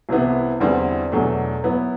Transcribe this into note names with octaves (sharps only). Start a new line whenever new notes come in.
C2 C3 E3 B3 E4
E2 D3 G3 C4 E4
E2 B2 F#3 A3 D4
F#3 B3 E4